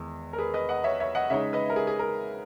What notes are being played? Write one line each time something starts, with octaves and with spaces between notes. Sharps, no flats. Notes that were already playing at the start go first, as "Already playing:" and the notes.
Already playing: E2 D#3 G#3
A#4
G#4 B4
B4 D#5
D#5 F#5
C#5 E5
C#5 E5
D#5 F#5
C#3 G#3 D#4 C#5 E5
B4 D#5
A#4
G#4
G#4
A#4